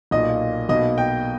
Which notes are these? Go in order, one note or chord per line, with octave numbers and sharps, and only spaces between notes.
B1 A#2 A#3 D#5
B1 B2 A#3 D#5
G5